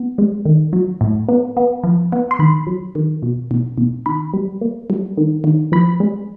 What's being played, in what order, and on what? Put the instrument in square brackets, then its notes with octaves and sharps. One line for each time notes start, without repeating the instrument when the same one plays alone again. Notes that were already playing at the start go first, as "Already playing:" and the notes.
Already playing: [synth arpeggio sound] B3
G#3
D#3
F#3
A2
B3
B3
F3
B3
C6
D#3 B5
F#3
D#3
B2
B2
B2
D#3 B5
G3
A#3
G3
D#3
D#3
F3 B5
G#3